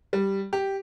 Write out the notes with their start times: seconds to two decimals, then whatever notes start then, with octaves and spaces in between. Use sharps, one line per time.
0.13 G3
0.53 G4